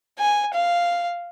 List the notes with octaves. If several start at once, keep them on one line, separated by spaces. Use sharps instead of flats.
G#5
F5